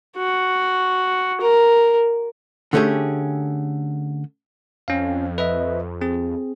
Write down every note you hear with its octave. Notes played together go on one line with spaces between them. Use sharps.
F#4
A#4
D3 A3 C#4 G4 G#4
F2 C#4 F5
B4 D#5 E5
C4 G#4